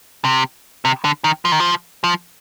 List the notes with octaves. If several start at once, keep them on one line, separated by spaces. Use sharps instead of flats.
C3
C3
D3
D#3
F3
D#3
F3
F3